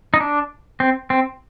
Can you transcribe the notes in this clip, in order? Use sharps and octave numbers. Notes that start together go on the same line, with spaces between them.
D#4
D4
C4
C4